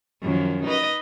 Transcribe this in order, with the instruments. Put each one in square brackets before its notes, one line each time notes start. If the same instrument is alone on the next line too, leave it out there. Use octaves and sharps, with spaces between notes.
[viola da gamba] F#2 D#3 F3
D#4 B4 D#5